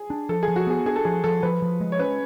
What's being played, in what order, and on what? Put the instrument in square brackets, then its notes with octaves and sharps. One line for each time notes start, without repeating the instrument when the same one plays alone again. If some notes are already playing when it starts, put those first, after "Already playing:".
Already playing: [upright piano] G#4
[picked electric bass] D4
[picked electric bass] F3 [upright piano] A4
[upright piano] G#4
[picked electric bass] F3
[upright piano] F#4
[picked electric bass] B3 [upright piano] G#4
[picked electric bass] D4 [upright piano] G#4
[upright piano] A4
[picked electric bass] F3 [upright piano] G#4
[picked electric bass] F3 [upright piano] A4
[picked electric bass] F3 [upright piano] B4
[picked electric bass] F3
G#3
[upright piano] C#5
[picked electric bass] C#4 [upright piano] B4